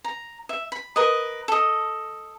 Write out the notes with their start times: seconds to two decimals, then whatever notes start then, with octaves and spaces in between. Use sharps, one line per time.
0.04 A#5
0.49 E5
0.72 B5
0.96 A#4 B4 D#5
1.48 A4 D#5